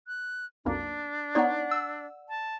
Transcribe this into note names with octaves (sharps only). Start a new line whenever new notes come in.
F#6
B1 F2 A#3 D4
B3 D#4 C#5 D5 F#5
E6
A5